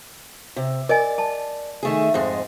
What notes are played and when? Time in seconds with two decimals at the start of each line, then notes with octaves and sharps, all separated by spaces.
0.56 C3
0.89 A#4 D5 D#5 G#5
1.18 A5
1.83 D#3 A3 G#4
2.14 F2 G#2 G#3